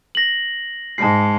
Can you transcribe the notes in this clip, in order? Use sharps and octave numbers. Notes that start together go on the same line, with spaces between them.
A#6 F#7
G#2 G#3 A5 C7